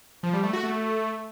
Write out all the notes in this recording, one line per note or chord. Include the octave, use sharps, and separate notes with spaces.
F3
G3
A3
F#4
A3